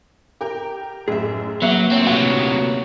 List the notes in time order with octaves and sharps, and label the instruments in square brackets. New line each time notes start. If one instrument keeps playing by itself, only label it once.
[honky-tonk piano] G4 A#4 G5
[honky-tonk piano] A1 F#2 [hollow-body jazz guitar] G#4 E5
[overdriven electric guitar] F#3 [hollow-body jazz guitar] A#3 B3 [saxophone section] F#4 [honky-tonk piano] E5 C7
[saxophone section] D2 A#2 C#5 [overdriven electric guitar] C4
[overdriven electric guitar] C3 F#3 [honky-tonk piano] F#5